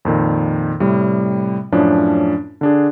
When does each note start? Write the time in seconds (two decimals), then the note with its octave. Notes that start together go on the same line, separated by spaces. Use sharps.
0.05 F2 A#2 D#3
0.80 A2 C3 G3
1.72 F#2 A2 F3 C#4 D4
2.61 D3 D4 G#4